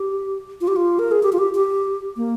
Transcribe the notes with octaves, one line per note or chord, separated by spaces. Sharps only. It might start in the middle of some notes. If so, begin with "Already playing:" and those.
Already playing: G4
F4
G4
F4
A#4
G#4
G4
F4
G4
G4
A#3